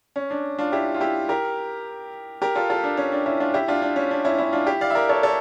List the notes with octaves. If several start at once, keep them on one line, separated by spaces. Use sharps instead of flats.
C#4
D4
D4 F4
E4 G4
F4
E4 G4
G4 A#4
G4 A#4
F4 A4
F4 A4
D4
C#4
D4
C#4 E4
D4 F4
E4 G4
D4 F4
D4
C#4
D4
C#4 E4
C#4 E4
D4 F4
E4 G4
D5 F5
E5
A#4 D5
A4 C#5
A4 C#5